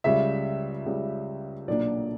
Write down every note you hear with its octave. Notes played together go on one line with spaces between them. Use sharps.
C#2 C#3 G3 E5
C#2 C#3 G3
B1 A#2 A#3 D4 D5